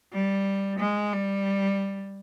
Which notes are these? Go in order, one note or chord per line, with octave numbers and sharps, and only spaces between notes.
G3
G#3
G3